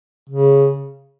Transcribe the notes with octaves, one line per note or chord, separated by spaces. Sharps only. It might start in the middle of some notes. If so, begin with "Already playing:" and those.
C#3